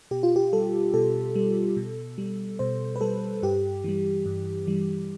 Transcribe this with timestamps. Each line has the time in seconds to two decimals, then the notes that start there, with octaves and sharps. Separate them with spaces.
0.11 B2 G4
0.23 F4
0.36 G4
0.53 G3 A4
0.94 B2 A4
1.35 G3
1.77 B2
2.18 G3
2.59 B2 C5
2.96 B4
3.01 G3 A4
3.43 G2 G4
3.84 E3 G3
4.26 G2
4.67 E3 G3